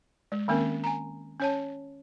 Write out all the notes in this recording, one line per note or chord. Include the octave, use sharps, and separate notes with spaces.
G#3
D#3 A#3 C4 C#4 A#4
G#5 A#5
C#4 C#5 A5